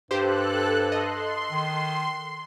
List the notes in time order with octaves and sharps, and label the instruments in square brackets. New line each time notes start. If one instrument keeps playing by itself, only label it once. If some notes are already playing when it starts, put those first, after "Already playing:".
[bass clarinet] G2 [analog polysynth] G4 C5 [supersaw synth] A4 F#6
[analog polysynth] D#5 [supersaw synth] C6
[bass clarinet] D#3